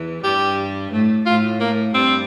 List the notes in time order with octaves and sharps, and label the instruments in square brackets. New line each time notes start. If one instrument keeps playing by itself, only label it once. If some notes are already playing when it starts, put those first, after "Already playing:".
Already playing: [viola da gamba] E2 E3
[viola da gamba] G2 G3 [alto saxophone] G4
[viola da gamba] A2 A3
[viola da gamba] A2 A3 [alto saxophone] F4
[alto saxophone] A#3
[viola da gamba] G2 G3 [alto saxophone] C4